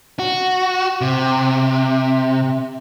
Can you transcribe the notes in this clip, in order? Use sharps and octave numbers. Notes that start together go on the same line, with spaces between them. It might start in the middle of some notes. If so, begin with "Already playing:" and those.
F#4
C3